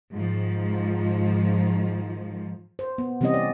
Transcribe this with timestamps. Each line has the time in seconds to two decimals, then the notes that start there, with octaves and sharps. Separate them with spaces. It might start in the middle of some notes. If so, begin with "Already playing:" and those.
0.15 G#2 D#3 F3
2.79 C5
2.98 B3
3.21 C3 E3 G3 C4 C#4 D#5
3.34 D5